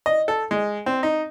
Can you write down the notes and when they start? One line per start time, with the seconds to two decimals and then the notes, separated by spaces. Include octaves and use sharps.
0.06 D#5
0.28 A4
0.51 G#3
0.86 C4
1.03 D#4